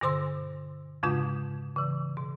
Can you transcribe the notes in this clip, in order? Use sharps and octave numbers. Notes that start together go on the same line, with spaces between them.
G2 B2 D3 C5 C6 E6
F2 G#2 C#3 G#3 F4 G6
C#3 E3
B2